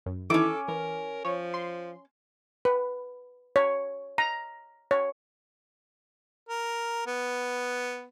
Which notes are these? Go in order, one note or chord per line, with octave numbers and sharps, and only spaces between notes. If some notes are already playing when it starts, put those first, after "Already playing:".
F#2
D#3 E3 C#4 E4 A4 D6
E3 A#4
F3 C#5
C6
B4
C#5
A#5
C#5
A#4
B3